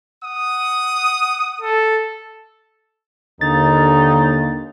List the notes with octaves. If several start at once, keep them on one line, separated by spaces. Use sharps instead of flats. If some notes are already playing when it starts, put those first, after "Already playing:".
F#5 D#6
A4
D#2 D3 D#4 A6